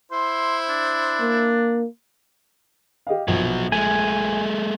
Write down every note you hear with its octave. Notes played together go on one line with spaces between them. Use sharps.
E4 C5 C6
D4
A#3
G4 D#5 F5
A#1 B2 F#3
G#3 A3 G#5